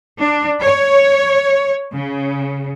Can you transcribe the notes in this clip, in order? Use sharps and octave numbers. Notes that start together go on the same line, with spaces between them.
D4
C#5
C#3